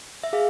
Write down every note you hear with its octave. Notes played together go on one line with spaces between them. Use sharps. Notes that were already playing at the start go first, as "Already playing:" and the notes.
E5
G#4 F5